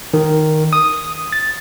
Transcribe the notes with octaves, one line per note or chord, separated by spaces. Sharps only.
D#3
D#6
A6